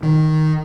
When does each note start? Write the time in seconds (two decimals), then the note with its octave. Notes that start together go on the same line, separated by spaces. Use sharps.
0.03 D#3